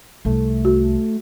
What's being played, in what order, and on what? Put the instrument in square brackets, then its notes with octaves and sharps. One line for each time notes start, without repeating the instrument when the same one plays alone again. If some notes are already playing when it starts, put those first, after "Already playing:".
[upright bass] C2 [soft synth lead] A3
[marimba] F#4